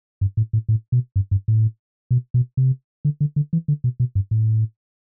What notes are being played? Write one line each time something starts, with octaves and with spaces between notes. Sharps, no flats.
G2
A2
A2
A2
B2
G2
G2
A2
B2
B2
C3
D3
D3
D3
E3
D3
B2
B2
G2
A2